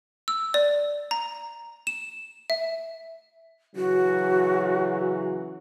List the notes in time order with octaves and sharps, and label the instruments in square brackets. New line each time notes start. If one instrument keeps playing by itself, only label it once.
[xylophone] E6
D5
A#5
E7
E5
[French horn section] C#3 E3 F#3 [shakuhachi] F#4